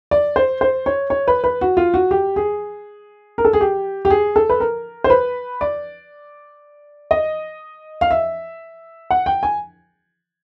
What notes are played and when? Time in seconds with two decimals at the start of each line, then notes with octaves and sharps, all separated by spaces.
0.11 D5
0.36 C5
0.61 C5
0.86 C#5
1.10 C#5
1.28 B4
1.44 B4
1.61 F#4
1.77 F4
1.94 F#4
2.11 G4
2.36 G#4
3.38 A#4
3.45 A4
3.53 G#4
3.61 G4
4.05 G4
4.10 G#4
4.36 A4
4.49 B4
4.60 A#4
5.04 C5
5.10 B4
5.61 D5
7.11 D#5
8.01 F5
8.11 E5
9.10 F#5
9.26 G5
9.43 G#5